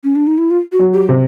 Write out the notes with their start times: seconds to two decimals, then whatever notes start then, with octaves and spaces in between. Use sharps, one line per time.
0.04 C#4
0.16 D4
0.27 D#4
0.38 E4
0.51 F4
0.72 F#4
0.79 F#3
0.94 G4
1.09 C3